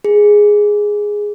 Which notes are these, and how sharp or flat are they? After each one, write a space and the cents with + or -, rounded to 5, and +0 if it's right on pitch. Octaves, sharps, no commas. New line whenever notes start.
G#4 +0